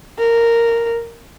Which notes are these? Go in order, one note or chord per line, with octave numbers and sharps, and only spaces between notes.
A#4